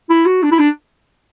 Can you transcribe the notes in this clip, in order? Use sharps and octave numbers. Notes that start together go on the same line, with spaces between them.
E4
F#4
D4
E4
D4